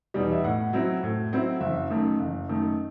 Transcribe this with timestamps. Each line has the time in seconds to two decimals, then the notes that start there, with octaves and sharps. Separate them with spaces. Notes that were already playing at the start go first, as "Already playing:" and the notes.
0.14 E2 B2 G3 D#4
0.32 E5
0.44 A2 F#5
0.73 F#3 C4 E4
1.03 A2
1.32 F#3 C4 E4
1.61 F#1 E5
1.90 F#2 D#3 A3
2.19 F#1
2.49 F#2 D#3 A3